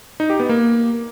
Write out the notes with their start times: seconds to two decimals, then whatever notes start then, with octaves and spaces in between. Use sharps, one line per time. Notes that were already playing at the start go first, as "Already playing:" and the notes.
0.20 D#4
0.30 G4
0.40 B3
0.49 A#3